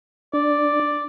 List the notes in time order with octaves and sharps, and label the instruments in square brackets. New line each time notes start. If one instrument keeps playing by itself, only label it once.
[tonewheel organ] D4 [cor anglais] D5